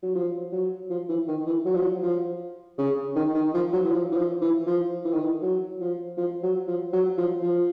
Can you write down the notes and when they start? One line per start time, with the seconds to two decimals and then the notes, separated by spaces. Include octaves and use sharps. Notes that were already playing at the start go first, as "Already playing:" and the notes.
0.03 F#3
0.15 F3
0.52 F#3
0.90 F3
1.09 E3
1.28 D#3
1.47 E3
1.65 F#3
1.74 F3
1.82 F#3
2.03 F3
2.78 C#3
3.16 D#3
3.35 D#3
3.54 F3
3.73 F#3
3.84 E3
3.91 F3
4.12 E3
4.16 F3
4.42 E3
4.67 F3
5.05 E3
5.13 D#3
5.20 E3
5.42 F#3
5.80 F3
6.18 F3
6.43 F#3
6.68 F3
6.93 F#3
7.18 F3
7.43 F3